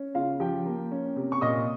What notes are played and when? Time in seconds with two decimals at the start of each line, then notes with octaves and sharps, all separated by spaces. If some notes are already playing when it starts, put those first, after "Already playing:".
Already playing: C#4
0.15 C#3 F4 F5
0.40 F3 G4 G5
0.66 A#3
0.91 C#4
1.16 C3
1.32 C#6
1.41 A#2 D#5 D#6